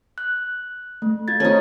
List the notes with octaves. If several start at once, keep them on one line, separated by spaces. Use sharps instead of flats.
F#6
A3
F4 G#6 A6
C#4 D#4 A4 C5